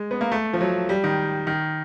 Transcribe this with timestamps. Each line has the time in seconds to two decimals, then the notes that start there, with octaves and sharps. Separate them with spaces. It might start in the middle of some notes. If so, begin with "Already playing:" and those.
Already playing: G#3
0.11 B3
0.21 A#3
0.32 A3
0.53 F3
0.61 F#3
0.89 G3
1.04 D#3
1.47 D#3